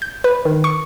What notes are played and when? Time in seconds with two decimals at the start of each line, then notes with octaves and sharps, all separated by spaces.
0.02 G6
0.24 B4
0.45 D#3
0.64 C#6